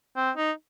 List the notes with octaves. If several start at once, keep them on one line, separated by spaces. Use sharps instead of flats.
C4
D#4